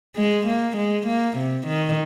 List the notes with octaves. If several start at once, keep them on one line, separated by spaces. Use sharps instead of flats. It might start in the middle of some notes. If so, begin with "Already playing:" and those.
G#3
A#3
G#3
A#3
C3
D#3